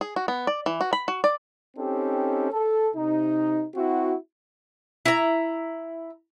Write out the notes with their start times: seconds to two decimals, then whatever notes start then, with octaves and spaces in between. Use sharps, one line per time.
0.01 G#4
0.16 F#4
0.28 B3
0.47 D5
0.66 E3
0.81 F#4
0.93 B5
1.08 F#4
1.24 D5
1.77 C4 C#4 D#4 G4 A4
2.52 A4
2.95 C3 D#4
3.75 C4 E4 F#4
5.05 E4 A#5